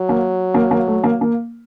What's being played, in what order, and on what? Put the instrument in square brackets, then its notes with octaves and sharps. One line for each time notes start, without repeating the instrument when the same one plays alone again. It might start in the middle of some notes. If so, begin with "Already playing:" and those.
Already playing: [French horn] F#3
[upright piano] A#3
A#3
A#3
A3
A#3
A#3